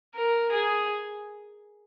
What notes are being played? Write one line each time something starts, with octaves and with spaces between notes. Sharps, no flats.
A#4
G#4